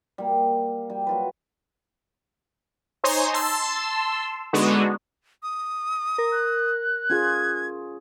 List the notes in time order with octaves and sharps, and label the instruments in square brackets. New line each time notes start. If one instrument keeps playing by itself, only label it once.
[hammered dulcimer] G3 A#3
G3
F#3 F4 B4
[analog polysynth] D#4 C5 C#5 G#5 A#5 C6
A5 C6 E6
D3 G#3 B3 D4 D#4 F#4
[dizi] D#6
[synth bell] A#4
[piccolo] F#6
[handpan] C#4 F4 G#4 [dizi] G#6